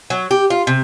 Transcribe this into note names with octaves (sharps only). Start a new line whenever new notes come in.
F#3
G4
F4
C3